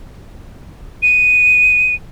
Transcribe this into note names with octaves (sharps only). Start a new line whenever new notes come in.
D#7